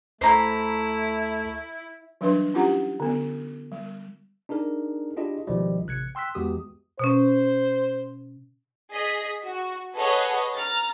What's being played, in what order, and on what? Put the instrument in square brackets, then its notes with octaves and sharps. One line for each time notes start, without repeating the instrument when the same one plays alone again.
[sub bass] D2 [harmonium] A3 [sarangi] E4 [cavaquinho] C5 A#5 B5
[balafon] E3 F#3 G3 D4 B4 C6
C#4 E4 F4 G4 F#5 A#5
D3 B3
G3
[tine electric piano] D4 D#4 G#4 A#4
D4 E4 F4 G4 G#4 D#5
C#2 B2 D#3 F3 G3 D#5
A1 C3 F#6 G#6 C#7
G5 C6 E6 F#6 B6
E2 G#3 F#4 G4 D#6
[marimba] B2 C#4 [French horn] C5
[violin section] G#4 D#5 B6
F#4
G#4 A4 B4 C#5 D#5 F#5
A#5 F6 A6